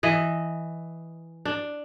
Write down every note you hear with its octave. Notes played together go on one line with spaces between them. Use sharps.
E3 D#5
D4